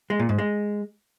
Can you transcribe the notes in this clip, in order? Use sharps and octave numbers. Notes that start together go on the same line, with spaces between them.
G#3
A#2
G#2
G#3